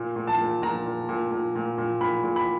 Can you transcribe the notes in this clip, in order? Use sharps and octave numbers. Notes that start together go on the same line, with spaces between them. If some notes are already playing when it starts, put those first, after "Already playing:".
Already playing: A#2
A#2
A5
A#2
A#2 A#5
A#2
A#2
A#2
A#2
A#2
A#2 B5
A#2
B5